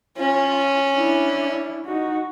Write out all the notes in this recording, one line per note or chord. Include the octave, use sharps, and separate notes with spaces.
C#4 F4
D4 E4
D#4 F#4